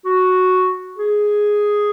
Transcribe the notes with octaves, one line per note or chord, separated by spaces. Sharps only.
F#4
G#4